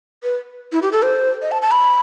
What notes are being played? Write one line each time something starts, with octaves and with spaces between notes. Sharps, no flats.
B4
E4
G4
A4
C5
D#5
A5
A5
B5